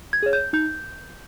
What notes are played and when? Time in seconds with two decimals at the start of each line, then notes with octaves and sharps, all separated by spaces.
0.13 G#6
0.23 G#4 C#5
0.33 G6
0.53 D#4 G6